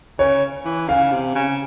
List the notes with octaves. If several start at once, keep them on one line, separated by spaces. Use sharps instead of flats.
C#3 C#5
E3
C#3 F5
C3
C#3